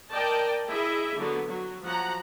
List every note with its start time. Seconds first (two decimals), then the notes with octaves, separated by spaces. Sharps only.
0.12 A#4 D5 D#5 G5 A5
0.69 E4 G#4 D#5 E5
1.18 D3 F#3 B3
1.48 F#3
1.85 F3 F#3 F#5 A#5